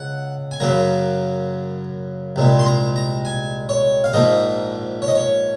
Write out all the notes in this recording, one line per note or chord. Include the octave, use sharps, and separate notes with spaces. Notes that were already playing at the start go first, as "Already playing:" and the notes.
Already playing: C#2 F#5
G#5
F#2 C#3 F#3 A#3 A#5
C2 A#2 G#3
C6
A#5
A#5
G#5
C#5
F5
A#1 G#2 F3 A#3 D#5
C#5
D#5
C#5